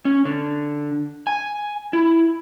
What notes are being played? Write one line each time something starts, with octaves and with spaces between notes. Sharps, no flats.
C#4
D3
G#5
E4